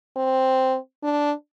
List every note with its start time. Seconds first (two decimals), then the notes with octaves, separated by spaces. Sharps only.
0.17 C4
1.03 D4